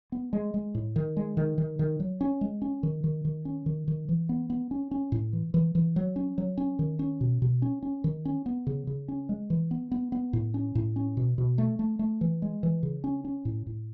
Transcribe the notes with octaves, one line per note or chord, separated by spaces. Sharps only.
B3
G#3
G#3
A2
D#3
G#3
D#3
D#3
D#3
F#3
C#4
G#3
C#4
D#3
D#3
D#3
C#4
D#3
D#3
E3
B3
B3
C#4
C#4
A2
E3
E3
E3
F#3
C#4
F#3
C#4
D#3
C#4
B2
B2
C#4
C#4
D#3
C#4
B3
C#3
C#3
C#4
G#3
E3
B3
B3
B3
A2
C#4
A2
C#4
B2
B2
A3
A3
A3
E3
G#3
E3
C#3
C#4
C#4
A2
A2